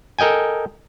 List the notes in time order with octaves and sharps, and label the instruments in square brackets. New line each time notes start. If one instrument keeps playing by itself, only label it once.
[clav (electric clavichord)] A4 A#4 D#5 G5 G#5